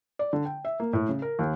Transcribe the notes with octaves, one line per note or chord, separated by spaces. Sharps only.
D5
D3
G5
E5
A#3
A2
C#3
A#4
D#2